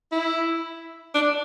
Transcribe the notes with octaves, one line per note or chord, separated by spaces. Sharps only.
E4
D4